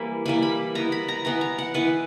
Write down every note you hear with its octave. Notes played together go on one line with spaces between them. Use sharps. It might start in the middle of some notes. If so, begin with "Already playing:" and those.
Already playing: E3 G3 A#3 B5
E3 G3 A#3 B5
B5
E3 B3 A#5
B5
A#5
E3 B3 A#5
A#5
F#5
E3 B3 B4